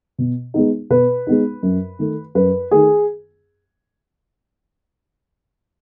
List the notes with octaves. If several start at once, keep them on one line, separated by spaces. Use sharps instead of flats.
B2
G#3 B3 D#4
B2 B4
G#3 B3 D#4
F#2
D#3 A3
F#2 B4
D#3 A3 G#4